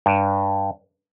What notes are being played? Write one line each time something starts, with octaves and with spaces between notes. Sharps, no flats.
G2